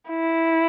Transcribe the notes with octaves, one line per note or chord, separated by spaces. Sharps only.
E4